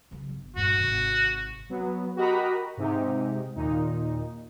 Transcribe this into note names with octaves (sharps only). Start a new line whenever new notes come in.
C#3 F#3
G1
A#1 G2 F#4
G#1 C3
F#3 B3
F#4 G4 A#4 D#5 A#5 B5
G#2 C3 D#4 G4
D#2 A#2 D#4